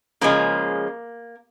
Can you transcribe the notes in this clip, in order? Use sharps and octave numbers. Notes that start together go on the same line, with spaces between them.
C#3 F3 G#3 A#3